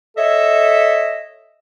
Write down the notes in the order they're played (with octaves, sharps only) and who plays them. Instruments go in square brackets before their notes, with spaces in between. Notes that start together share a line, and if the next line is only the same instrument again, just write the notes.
[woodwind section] A4 C#5 D#5 E5